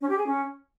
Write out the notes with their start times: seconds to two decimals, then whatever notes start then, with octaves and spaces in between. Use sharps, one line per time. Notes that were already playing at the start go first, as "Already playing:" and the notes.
0.01 C#4
0.09 G4
0.17 G#4
0.25 C#4